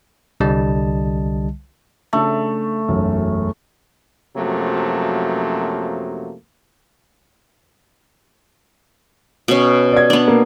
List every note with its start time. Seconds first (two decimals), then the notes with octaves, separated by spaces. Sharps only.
0.40 C2 D3 G3 D#5 A5
2.13 C#3 A3 D4
2.88 E1 B1 F#2
4.36 F#2 C3 F3 F#3 A3 A#3
9.48 B2 C#4
9.92 D5 G#6
10.10 B3 D4
10.28 A#3